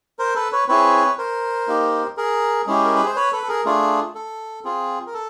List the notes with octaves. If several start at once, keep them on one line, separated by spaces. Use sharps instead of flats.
A#4 C5
A4 B4
B4 C#5
C4 E4 G#4 B4 C#5
A#4 C5
A#3 D#4 G4
G#4 A#4
G#3 C#4 E4 G4 G#4
A#4
B4
C5
B4 C#5
A4 B4
A4
G#4 A#4
A3 D4 F4 G#4
A4
C4 F4 G#4
A#4
A4